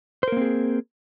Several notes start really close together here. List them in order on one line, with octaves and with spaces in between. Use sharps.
C5 A#4 A#3 C4 G#4